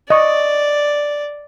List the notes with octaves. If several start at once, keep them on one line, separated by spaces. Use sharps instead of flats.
D5 D#5 C#6